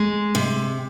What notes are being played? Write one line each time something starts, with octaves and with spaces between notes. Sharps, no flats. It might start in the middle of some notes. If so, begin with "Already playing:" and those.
Already playing: G#3
C3